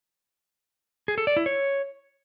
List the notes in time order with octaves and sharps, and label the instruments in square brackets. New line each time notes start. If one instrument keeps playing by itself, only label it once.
[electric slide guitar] G#4
A4
D5
E4
C#5